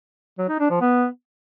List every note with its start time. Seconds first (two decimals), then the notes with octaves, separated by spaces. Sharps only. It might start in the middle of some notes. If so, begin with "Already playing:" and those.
0.38 F#3
0.49 D#4
0.60 D4
0.71 F3
0.81 B3